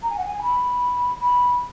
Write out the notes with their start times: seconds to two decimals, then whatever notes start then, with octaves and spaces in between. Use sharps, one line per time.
0.03 A#5
0.10 G#5
0.18 F#5
0.26 G#5
0.42 B5
1.20 B5